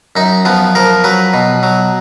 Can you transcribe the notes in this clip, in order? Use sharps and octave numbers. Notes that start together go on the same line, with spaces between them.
F#2 D#4
F3 B3
F3 A#4
F#3 B4
B2
F#3